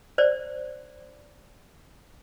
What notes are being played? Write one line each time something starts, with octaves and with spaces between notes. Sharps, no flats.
C5 D5